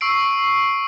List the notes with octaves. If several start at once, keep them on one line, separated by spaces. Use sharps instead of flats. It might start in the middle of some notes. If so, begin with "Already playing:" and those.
C#6 E6 C7 D7